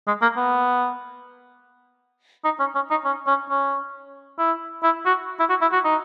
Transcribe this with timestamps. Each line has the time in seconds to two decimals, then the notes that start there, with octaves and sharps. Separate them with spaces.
0.07 G#3
0.22 A#3
0.37 B3
2.45 D#4
2.59 C#4
2.75 C#4
2.90 D#4
3.05 C#4
3.27 C#4
3.50 C#4
4.38 E4
4.83 E4
5.06 F#4
5.40 E4
5.50 F#4
5.61 E4
5.72 F#4
5.84 D#4